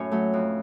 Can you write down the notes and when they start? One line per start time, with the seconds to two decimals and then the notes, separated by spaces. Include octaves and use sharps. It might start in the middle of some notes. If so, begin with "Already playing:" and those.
Already playing: F#2 A2 C#4 C#5
0.11 F#3 A3
0.33 F2